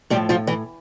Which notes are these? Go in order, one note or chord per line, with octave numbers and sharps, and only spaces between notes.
A2 F3 G3 G4
F3 F4
E3 E4